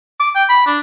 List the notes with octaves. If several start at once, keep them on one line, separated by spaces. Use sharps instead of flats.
D6
G5
B5
D4